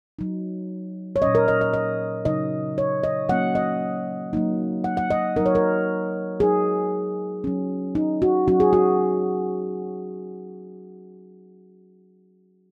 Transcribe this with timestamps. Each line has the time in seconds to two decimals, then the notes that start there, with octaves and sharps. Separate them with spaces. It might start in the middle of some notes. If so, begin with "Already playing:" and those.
0.19 F#3 D#4
1.16 C#5
1.22 A#2 F#3 C#4 D#5
1.35 A#4
1.48 D#5
1.61 D#5
1.73 D#5
2.25 C#3 F#3 D#4 D#5
2.78 C#5
3.03 D#5
3.29 F#3 A#3 C#4 F#5
3.55 D#5
4.33 F#3 A#3 D#4
4.84 F#5
4.97 F#5
5.10 D#5
5.36 F#3 D#4 A#4
5.46 C#5
5.55 A#4
6.40 F#3 D#4 G#4
7.44 F#3 C#4
7.95 D#4
8.22 F#4
8.47 F#3 C#4 F#4
8.60 G#4
8.73 F#4